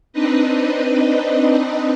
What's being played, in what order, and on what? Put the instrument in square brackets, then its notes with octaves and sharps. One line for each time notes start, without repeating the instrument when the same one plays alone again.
[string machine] C4 D4 D#4 B4 D#5